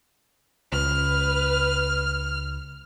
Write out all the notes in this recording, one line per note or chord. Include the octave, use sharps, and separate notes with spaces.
C#2 B4 F6